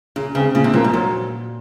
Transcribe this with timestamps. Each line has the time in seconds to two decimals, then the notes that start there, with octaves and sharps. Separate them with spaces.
0.16 A#2 C#3
0.35 C#3 G#3 C4
0.55 A#2 C#3
0.64 C3
0.74 A#2 F3 A#3
0.84 G#2
0.93 A#2 F#3